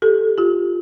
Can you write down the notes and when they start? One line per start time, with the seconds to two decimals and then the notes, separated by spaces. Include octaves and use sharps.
0.02 G4 A4
0.38 F4 G4